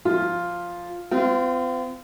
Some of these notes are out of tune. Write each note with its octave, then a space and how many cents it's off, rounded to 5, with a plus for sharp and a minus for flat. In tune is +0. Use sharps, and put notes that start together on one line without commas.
F3 +0 F4 +0
C4 -40 F4 -15